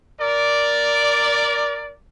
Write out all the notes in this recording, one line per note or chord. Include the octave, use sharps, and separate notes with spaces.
A#4 D5